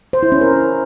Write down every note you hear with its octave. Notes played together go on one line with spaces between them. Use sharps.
C5
E4
C#4
A#4